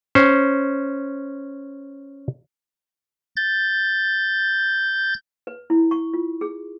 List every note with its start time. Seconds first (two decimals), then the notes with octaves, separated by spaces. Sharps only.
0.15 C#4 C5
3.36 G6 A6
5.47 B4
5.70 E4
5.91 C#6
6.14 F4
6.41 G#4